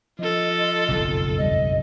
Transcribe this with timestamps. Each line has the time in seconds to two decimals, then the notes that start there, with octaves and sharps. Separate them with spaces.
0.19 F3 F4 A4 D#5
0.89 F#1 B1 F2
1.37 E2 G3 D#5